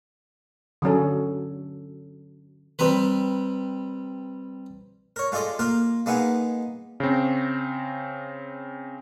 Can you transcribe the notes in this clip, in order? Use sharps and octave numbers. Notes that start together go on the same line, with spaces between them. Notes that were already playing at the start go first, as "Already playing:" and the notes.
D3 F#3 C#4 A4
G3 C4 A#4 B4
A#4 C#5
G#3 F4 A4 D5 D#5
A#3 F4 A#4
G#3 A#3 B3 D#4 G#4
C#3 C4